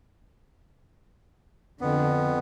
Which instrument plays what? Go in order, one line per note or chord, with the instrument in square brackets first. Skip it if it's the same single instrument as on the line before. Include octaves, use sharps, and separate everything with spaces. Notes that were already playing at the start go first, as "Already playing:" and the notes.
[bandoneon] F2 B3 [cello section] D3